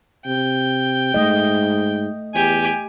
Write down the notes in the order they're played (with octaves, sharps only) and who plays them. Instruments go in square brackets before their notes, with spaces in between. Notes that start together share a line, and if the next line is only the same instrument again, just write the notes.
[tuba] C3 [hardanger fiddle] G5
[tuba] G#2 [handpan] A3 D#5
[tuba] E2 [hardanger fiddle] G4 G#5